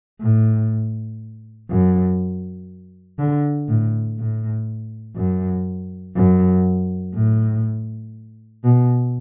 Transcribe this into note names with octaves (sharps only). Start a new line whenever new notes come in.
A2
F#2
D3
A2
A2
F#2
F#2
A2
B2